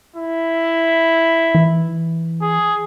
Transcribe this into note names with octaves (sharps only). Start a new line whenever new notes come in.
E4
E3
G#4